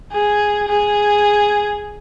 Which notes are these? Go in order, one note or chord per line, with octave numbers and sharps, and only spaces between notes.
G#4
G#4